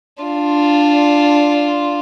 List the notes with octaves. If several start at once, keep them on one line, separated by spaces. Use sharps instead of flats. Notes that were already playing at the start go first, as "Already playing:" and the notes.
D4 F4